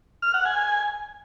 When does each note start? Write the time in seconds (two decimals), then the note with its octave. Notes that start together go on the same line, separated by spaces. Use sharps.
0.22 F6
0.34 F#5
0.45 G#5